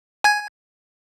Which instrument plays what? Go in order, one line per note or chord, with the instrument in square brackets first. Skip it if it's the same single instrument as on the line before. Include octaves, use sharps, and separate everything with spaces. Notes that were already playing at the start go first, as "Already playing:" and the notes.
[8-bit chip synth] G#5 G#6